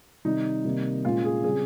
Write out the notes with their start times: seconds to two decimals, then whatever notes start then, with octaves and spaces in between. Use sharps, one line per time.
0.25 C3 D#3 G3 D#4
0.65 C3 D#3 G3 A#3
1.04 A#2 G#3 C#4 F4
1.25 G#4
1.44 C#3 G3 C4 G#4